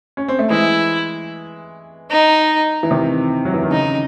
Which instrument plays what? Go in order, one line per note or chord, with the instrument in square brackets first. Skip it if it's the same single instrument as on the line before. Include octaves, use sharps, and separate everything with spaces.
[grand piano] C#4
C4
A3
[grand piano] E3 G#3 [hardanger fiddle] E4
[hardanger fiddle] D#4
[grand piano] E3
C3 D#3
F#3
E3
D#3
[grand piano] C#3 [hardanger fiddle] D#4